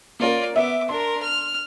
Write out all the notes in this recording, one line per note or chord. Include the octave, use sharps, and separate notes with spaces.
A#3 C#4 F4 A#4 D5
B3 E5 D6
D4 A#4 C6
F6